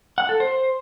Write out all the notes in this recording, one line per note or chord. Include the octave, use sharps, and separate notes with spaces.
F#5
A4
C5